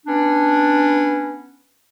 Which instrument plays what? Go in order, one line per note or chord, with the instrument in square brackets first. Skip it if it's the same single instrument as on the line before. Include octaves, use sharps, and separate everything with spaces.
[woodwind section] B3 C#4 D4